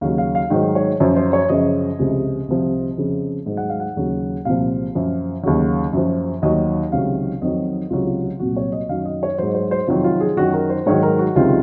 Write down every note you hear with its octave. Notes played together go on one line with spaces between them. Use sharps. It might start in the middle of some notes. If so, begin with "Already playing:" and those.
D#2 C#3 F#3 F5
F5
F5
G#2 D#3 F#3
C#5
F#2 F3 C#5
C5
C#5
F#2 C#3 F3 D#5
C#2 C3 F3
C2 C3 F3
F2 C#3 F3
G#2 D#3 F#3
F#5
F5
F#5
D#2 C#3 F#3
C2 A#2 F3 F5
F#2 F3
D#2 C#3 F#3
F#2 F3
D#2 D#3 F#3 D#5
C#2 C3 D#3 F#3 F5
F2 D#3 F#3 D#5
C#2 C3 F#3 F4
F4
F4
C2 A#2 F#3 F#4
C#5
D#5
F#2 D#3 F#3 F5
D#5
C#5
G#2 F#3 C5
C5
C5
F2 C3 D#3 F#3 F4
F4
G#4
F#2 D#3 F#3 F#4
A#4
C5
G#2 D#3 F#3 C#5
A#4
F#4
C#2 C3 D#3 F#3 F4